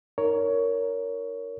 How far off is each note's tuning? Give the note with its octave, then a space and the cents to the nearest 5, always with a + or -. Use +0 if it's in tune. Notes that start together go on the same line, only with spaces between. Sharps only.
D#4 +0 A#4 +0 C#5 +15